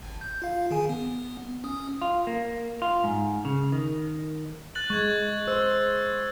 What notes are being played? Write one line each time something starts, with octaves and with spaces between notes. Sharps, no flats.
G#1
G6
F4 F5
D#3 G#4 G#5
B3
C#4 D#6
F4
A#3
F4
G#2
C#3
D#3
F#6 A6 F#7
G#3 C#6 G#6
C5 E6